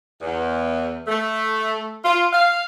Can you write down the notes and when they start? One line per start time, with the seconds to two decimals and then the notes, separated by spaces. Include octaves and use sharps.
0.22 E2
1.07 A3
2.05 F4
2.33 F5